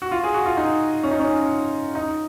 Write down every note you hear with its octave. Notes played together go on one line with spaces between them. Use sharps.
F#4
F4
G#4
F#4
F4
D#4
C#4
D#4
C#4
D#4